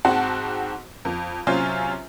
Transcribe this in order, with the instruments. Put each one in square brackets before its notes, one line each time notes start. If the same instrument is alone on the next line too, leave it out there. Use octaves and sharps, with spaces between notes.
[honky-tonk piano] G#2 C4 F#4 F#5 A5
F2
C3 F#3 C#4 F4 C5 G#5